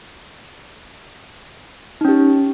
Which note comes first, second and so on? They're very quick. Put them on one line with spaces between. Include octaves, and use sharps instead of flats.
D#4 C#4 G4